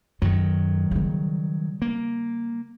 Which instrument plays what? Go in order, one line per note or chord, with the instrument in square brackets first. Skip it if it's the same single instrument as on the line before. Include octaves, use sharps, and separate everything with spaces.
[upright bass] F#2 [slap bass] D#3 F#3
[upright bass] C#3 G3
[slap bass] A#3